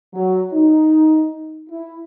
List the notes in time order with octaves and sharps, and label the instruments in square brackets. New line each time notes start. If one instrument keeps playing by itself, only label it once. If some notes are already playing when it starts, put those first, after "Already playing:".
[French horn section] F#3
D#4
E4